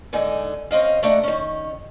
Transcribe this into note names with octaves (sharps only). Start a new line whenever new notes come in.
G#2 D3 D#4 G#5
C4 C#4 D#5 F5
A3 D4 D#4 F#5
D#3 C#4